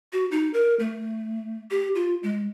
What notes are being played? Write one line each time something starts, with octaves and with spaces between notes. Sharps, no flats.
F#4
D#4
A#4
A3
G4
F4
G#3